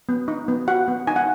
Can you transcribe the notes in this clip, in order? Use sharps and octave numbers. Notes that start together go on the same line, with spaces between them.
B3
D#4
B3
F#4 F#5
B3
D#4 G#5
F#5